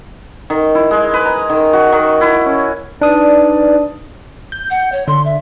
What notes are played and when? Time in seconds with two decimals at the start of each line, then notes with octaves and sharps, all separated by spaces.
0.50 D#3
0.75 E4
0.91 G#3
1.14 B4
1.25 A#5
1.50 D#3
1.73 F#4
1.92 D#3
2.21 E4
2.46 C#4
3.01 D4 D#4 B4 D5 D#6
4.52 G6
4.70 F#5
4.92 C#5
5.08 D3 C6
5.25 E5